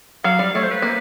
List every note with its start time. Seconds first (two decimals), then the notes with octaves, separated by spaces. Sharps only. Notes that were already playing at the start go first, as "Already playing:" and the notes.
0.24 F#3 F5
0.39 G3
0.55 A3 C#5
0.63 C5
0.71 B4
0.82 A#3